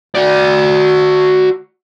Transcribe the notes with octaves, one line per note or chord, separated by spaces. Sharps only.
F#4 D5